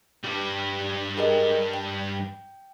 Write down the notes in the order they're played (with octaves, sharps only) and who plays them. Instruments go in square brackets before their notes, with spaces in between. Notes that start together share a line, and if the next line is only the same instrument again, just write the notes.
[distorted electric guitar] G2 G3
[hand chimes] G#4 A#4 D#5
G5